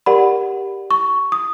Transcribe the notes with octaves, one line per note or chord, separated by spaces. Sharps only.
G4 A#4 D5 F#5 B5
C#6
D#6